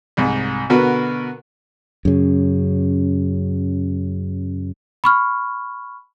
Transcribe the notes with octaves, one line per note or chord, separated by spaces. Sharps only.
C2 G#2
B2 D3 F#4 A#4 B4
F#2 C#3
B5 C#6 F6